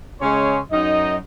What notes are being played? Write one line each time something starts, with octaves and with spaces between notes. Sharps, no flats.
C#3 G#3 C#4 G#4 C#5 C6
F#2 D#4 D#5